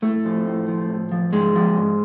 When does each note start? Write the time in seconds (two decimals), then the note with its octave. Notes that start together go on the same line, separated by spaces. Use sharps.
0.02 A2 A3
0.25 F3
0.46 A2
0.68 F3
0.89 A2
1.12 F3
1.33 G#2 G#3
1.55 F3
1.77 G#2